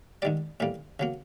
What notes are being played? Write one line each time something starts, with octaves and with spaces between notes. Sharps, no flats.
G#2 D#3 G3 D5
A2 E3 G3 A#3
C#3 F#3 A#3